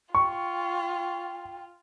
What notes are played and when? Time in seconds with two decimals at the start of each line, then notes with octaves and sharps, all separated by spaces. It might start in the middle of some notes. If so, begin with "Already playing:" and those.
0.15 F4 G5 C#6